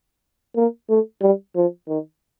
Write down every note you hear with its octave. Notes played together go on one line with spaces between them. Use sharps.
A#3
A3
G3
F3
D#3